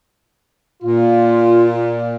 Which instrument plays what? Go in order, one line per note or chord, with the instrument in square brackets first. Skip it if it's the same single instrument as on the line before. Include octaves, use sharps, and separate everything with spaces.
[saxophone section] A#2 [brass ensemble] F4